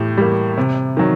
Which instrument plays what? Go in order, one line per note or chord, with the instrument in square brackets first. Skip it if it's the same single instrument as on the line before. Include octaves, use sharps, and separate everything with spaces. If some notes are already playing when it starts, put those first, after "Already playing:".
Already playing: [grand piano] A2 G4
G3 A#3
C3
D#3 F#3